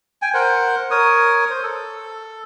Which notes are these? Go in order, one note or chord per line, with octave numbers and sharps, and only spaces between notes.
G5 G#5
A#4 C5 F#5
A#4 C#5 D#6
C5
A4